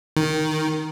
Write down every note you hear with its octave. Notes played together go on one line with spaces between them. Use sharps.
D#3